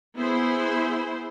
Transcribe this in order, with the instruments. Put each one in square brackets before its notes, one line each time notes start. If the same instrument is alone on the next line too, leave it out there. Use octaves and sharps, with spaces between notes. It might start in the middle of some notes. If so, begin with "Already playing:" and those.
[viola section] B3 E4 G#4 C5